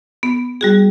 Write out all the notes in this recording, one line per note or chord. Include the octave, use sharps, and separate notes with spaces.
B3
G3 F#4 G#4